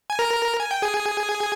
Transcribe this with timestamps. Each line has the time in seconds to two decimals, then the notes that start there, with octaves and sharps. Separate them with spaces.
0.10 G#5
0.19 A#4 A#5
0.60 G#5
0.71 G5
0.82 G#4 G#5